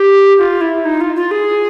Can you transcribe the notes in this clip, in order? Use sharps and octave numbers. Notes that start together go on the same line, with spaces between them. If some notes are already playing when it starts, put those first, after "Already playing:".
Already playing: G4
F4
E4
D#4
F4
F4
G#4